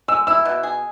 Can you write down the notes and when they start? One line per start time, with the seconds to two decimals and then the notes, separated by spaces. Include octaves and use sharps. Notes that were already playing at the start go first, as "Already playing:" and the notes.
0.08 G#3 E6
0.27 E4 E6
0.45 B2
0.63 G#4